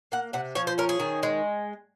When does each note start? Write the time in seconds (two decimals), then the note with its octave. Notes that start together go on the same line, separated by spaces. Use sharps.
0.12 A#3 F#5
0.33 C3 F#5
0.55 F3 C#5
0.67 C5
0.78 C#4 A#4
0.89 G#4
1.00 D#3
1.23 G#3